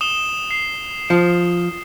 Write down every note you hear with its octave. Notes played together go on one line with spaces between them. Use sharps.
D#6 E7 G7
C7
F3